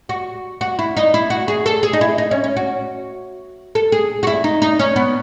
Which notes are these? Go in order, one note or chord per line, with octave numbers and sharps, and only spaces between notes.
F#4
F#4
E4
D#4
E4
F#4
G#4
A4
G#4
D#4
E4
D#4
C#4
C#4
F#4
A4
G#4
F#4
E4
D#4
D#4
C#4
B3